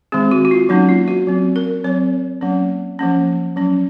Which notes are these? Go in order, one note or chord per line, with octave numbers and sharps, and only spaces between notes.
D#3 G#3 C4 G#4
F#4
F#4
F4
F#3 A#3 C#4 D#4
F4
F#4
F#3 C4
A#4
F#3 C4 C#5
F#3 A#3 C#4
F3 A#3 C#4
F#3 C#4